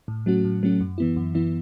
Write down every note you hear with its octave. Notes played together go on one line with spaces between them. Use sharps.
A2
F#3 A3 C#4 F#4
A2
F#3 A3 C#4 F#4
F#2
E3 B3 E4
F#2
E3 B3 E4